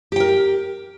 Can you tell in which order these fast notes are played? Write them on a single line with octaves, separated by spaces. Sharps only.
G4 G5 A#4